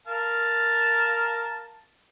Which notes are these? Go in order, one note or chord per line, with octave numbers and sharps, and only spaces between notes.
A#4 F5 A5